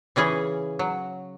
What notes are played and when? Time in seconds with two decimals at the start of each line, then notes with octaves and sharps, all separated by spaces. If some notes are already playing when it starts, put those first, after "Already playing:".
0.16 C#3 E3 C#4 G#4
0.79 F#3